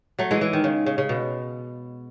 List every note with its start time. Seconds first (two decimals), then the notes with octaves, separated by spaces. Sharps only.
0.19 F#3 A3
0.31 E3 G#3
0.41 E3
0.53 D#3
0.64 C#3
0.86 C#3
0.98 C#3
1.09 B2